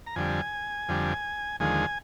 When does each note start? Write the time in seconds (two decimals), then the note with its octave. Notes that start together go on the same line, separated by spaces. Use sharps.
0.07 A#5
0.16 F2 D3 G3 G#5
0.89 F2 D3 G3
1.60 D#2 D3 F3 G#3 G#5